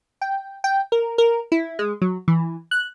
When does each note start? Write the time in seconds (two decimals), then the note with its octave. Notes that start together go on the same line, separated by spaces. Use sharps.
0.22 G5
0.64 G5
0.92 A#4
1.18 A#4
1.52 E4
1.79 G#3
2.02 F#3
2.28 E3
2.71 F#6